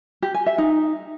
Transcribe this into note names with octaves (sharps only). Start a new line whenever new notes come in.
G4
G#5
E5
D#4